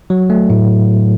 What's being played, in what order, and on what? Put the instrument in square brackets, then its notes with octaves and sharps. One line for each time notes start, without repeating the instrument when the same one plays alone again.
[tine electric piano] F#3
A3
A2